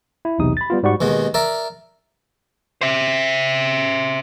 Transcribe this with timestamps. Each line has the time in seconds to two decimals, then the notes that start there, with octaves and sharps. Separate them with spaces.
0.25 E4
0.38 B1 E2 C3 D#4 D#6
0.57 B5 A6
0.70 G3 B3 F4
0.83 G#2 G3 F#4 D5 F#5 C#6
1.01 D#2 B2 G#3
1.34 A#4 D5 E5
2.81 C5 E5